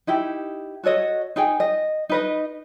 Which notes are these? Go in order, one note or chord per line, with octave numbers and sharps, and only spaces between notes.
D#4 E4 G4
F#4 A4 C#5 D#5
D#4 G#4 G5 G#5
D#5
D#4 B4 D#5